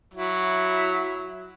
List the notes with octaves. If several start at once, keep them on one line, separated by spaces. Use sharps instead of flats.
F#3 E4